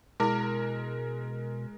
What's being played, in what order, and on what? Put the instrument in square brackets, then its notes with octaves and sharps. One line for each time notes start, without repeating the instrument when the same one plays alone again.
[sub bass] B2 [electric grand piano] G#3 A#4 [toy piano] E4 D6